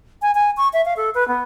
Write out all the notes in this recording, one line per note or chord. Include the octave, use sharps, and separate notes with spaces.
G#5
G#5
C#6
E5
F5
A4
B4
B3